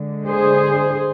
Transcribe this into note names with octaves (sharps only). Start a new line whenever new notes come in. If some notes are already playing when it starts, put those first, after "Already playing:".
Already playing: D3 G#3
G#4 C5